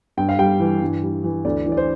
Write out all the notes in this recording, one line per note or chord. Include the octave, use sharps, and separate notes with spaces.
G2 G5
F5
G3 G5
E3
G2
G3
E3
D2 D5
E3
D5
C5